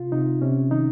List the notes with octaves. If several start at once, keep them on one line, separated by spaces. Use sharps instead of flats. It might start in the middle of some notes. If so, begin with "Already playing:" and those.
Already playing: C3 F4
C3 D#4
C3 C#4
D#3 D#4